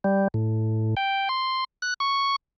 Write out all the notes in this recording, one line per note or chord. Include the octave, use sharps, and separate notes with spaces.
G3
A2
G5
C6
F#6
C#6